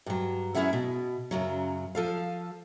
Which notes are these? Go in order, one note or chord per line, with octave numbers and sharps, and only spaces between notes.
G2 F#3
F#2 C#4 E4 G#4 E5 F#5
B2
F#2 C#3 F#3
F3 A4 F5